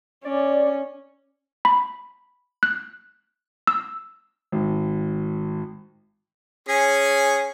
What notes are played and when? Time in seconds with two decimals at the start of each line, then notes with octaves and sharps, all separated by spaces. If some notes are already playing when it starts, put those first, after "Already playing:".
0.24 C#4 D5
1.65 B5
2.63 F#6
3.67 E6
4.52 G#1
6.69 C#4 G#4 G#5